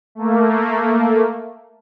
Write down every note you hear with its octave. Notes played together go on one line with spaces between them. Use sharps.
A3 A#3